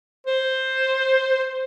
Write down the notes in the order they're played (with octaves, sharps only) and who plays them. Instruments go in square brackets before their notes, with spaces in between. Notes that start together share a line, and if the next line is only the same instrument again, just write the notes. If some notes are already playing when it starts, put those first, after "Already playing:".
[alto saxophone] C5